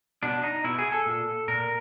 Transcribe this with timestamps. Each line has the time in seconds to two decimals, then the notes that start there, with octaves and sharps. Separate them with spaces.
0.23 B2 D4
0.43 D#4
0.64 B2 E4
0.79 G#4
0.92 A4
1.06 A#2
1.48 A#2 A#4